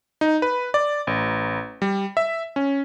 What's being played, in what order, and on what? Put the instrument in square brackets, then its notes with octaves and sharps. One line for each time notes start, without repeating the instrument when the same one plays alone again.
[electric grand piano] D#4
B4
D5
A1
G3
E5
C#4